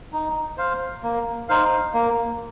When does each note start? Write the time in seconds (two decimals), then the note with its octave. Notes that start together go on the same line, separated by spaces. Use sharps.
0.12 D#4
0.57 C5 F5
1.03 A#3
1.49 D#4 C5 F5
1.94 A#3